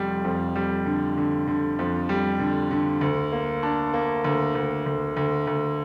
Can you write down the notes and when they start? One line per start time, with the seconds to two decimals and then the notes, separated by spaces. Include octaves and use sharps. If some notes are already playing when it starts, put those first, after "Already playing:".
Already playing: F1 F2 G3
0.24 F2
0.56 G3
0.86 D3
1.17 D3
1.47 D3
1.79 F2
2.09 G3
2.40 D3
2.71 D3
3.01 D2
3.32 A#3
3.63 D4
3.93 A#3
4.24 D2
4.55 D2
4.86 D2
5.17 D2
5.47 D2